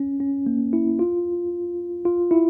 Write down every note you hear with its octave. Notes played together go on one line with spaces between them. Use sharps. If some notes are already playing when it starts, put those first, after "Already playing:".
Already playing: C#4
C#4
A#3
E4
F4
F4
E4